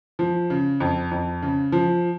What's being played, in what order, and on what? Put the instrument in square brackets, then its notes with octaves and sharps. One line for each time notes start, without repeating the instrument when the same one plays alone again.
[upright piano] F3
C#3
F2
F2
C#3
F3